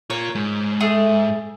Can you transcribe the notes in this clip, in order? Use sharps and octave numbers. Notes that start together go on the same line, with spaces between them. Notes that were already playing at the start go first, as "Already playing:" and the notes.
F4 A#4 C#5
G#2
A3 G#4